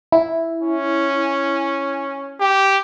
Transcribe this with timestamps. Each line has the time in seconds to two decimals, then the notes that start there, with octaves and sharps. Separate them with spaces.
0.12 E4
0.62 C#4
2.40 G4